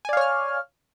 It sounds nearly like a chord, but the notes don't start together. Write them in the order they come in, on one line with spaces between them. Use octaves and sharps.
G#5 D5 F5 C#5 F6